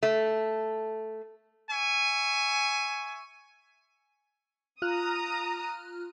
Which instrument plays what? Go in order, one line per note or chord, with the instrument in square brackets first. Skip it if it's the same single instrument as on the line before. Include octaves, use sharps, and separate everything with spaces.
[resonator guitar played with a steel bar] A3
[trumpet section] E5 G#5 C#6
[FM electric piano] F4 F6 F#6 [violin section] A#5 D#6